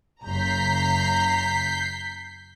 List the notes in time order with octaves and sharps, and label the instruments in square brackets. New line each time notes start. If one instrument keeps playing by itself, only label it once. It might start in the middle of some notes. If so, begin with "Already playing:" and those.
[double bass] F#1 C#3 [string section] A#5 [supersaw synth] G6 B6 C7